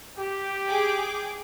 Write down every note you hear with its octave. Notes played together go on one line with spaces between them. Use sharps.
G4
G#4 G5 D6